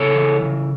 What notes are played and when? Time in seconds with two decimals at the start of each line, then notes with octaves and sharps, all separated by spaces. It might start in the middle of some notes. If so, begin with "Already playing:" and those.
Already playing: C#3 A4 C#5
0.15 E3
0.42 C#3